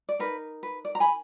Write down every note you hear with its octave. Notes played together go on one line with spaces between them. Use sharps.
D5
D#4 A#4 B4
B4
D5
A#5
G#5 B5